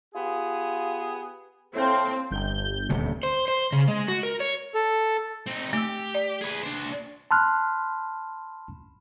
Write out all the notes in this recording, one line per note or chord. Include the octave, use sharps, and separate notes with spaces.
B3 F4 G4 G#4
A2 A3 C4 A4 F5
G1 G6
D#1 D2 C3
C5
C5
C#3
G#3
F#4
A#4
C#5
A4
C4 D#4
A3 G4 E6
D5
G#4 B4
D4 C5
A5 B5 C6 F6 F#6